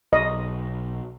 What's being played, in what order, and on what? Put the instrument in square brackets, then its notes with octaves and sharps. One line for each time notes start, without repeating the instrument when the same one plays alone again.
[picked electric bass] B1 [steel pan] D#5